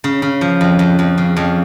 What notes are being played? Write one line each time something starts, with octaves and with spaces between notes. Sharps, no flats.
C#3
C#3
F3
F2
F2
F2
C#3
F2